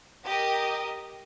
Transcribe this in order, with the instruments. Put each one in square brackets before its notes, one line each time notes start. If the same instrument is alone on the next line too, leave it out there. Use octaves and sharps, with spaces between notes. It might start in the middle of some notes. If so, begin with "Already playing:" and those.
[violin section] G4 A#4 D#5